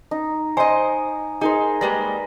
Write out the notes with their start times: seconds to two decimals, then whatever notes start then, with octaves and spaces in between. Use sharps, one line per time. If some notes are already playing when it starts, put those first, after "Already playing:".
0.11 D#4
0.57 D#4 C5 D#5 G#5
1.41 D#4 G#4 A#4 C5
1.81 G3 G#3 A#3 B4 A#6